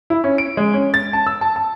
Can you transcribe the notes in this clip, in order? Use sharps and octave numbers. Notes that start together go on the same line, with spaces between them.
E4
C#4
D7
G#3
C#4
A6
A5
E6
A5
A5